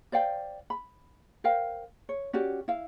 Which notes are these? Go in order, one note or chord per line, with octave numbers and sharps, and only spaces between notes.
C5 D5 F5 G5
B5
A#4 C5 F5 G5
C#5
C#4 F#4 G4 D5
E4 F5